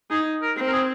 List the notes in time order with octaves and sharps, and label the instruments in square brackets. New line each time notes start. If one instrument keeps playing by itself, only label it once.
[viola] D#4 [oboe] G#4
[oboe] A#4
[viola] C4
[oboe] A#4
G#4